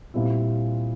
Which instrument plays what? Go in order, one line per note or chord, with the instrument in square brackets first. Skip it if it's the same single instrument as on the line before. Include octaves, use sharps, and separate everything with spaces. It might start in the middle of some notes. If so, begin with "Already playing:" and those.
[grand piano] A#2 G3 C4 E4